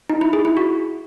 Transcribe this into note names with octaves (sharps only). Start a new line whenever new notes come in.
D#4
E4
G#4
E4
F#4